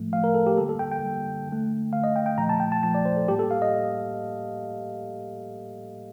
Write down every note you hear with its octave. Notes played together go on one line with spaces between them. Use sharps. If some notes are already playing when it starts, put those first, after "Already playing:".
Already playing: A2 F3 A3
A2 F3 A3 F5
A#4
A4
G4
D3 G3 A#3 A4
A4
G5
G5
D3 G3 A#3
D3
A3
D3 A3 F5
D#5
G5
G5
A#2 F3 A3 A#5
A5
G5
A5
A#2 F3 A3 A5
D5
C5
A4
A2 G3 A#3 G4
A4
F5
D#5